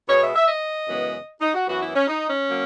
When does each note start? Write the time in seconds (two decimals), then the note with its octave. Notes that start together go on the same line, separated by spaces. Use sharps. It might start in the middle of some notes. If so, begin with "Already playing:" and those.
0.08 B2 G#3 B3 C#5
0.21 E5
0.35 E5
0.48 D#5
0.88 F#2 C#3 E3 G#3 B3
1.41 D#4
1.54 F#4
1.67 F#2 E3 B3 F#4
1.81 E4
1.95 C#4
2.07 D#4
2.28 C#4
2.47 F#3 A#3